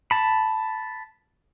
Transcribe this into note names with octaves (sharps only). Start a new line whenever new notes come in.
A5 B5